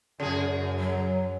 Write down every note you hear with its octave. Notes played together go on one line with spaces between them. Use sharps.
F#2 C#3 G#4
F#3